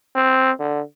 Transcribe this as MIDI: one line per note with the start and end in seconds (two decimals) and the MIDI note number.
0.15 0.52 60
0.59 0.81 50